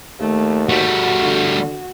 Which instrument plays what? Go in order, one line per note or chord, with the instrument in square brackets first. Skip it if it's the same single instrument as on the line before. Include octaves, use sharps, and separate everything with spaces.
[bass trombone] D#2 [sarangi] A3
[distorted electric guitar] G3 A3 [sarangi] F#4
[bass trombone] D3